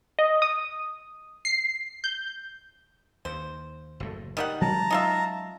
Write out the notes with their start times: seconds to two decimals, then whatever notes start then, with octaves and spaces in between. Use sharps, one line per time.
0.19 D#5
0.42 D#6
1.45 C7
2.04 G6
3.25 D#2 C5
4.00 F#1 A2 A3
4.37 D#3 G3 F#5
4.61 F#3 G#3 C#4 A5 A#5
4.90 D#4 F4 E5